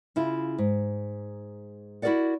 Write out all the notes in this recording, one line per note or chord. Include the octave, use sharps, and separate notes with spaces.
C#3 E4 F4
G#2
E4 F#4 A4 A#4 D5 F#5